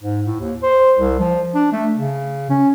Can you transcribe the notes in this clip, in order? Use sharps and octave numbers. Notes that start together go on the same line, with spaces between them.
G#2
A2
D#2
C5
C2
F3
D4
A3
C#3
C#4